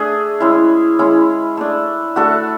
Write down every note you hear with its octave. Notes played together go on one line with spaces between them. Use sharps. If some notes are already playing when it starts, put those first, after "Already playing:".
Already playing: A3 D4 G#4
G#3 C#4 E4
G#3 C#4 E4
A3 D4
A3 D4 F#4 A4